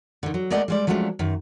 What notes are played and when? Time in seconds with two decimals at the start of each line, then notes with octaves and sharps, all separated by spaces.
0.23 D3 D#3
0.34 F#3
0.50 G#3 A3 A#4 D5 D#5 F#5
0.68 G3 G#3 D5
0.87 F3 F#3 G#3 A3 C#4 D4
1.19 F#2 D#3